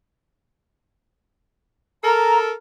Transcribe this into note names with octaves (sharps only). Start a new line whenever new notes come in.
A4 A#4 A#5